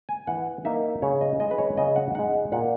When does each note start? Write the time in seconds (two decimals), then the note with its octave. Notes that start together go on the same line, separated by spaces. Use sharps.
0.09 G#5
0.27 E3 F#5
0.65 A#3 D#4 E5
1.02 C#3 C#5
1.21 D#5
1.40 G#3 D#4 D#5
1.51 B4
1.58 C#5
1.77 C#3 D#5
1.96 F#5
2.15 G#3 D#4 F#5
2.52 A#2 F#5